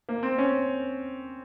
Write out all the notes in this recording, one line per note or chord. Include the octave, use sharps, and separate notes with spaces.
A#3
C4
C#4